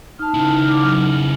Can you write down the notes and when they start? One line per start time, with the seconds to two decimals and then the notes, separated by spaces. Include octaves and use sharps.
0.19 D#4 A5 F6
0.34 C#3 E4
0.68 D#4 D6
0.82 F#3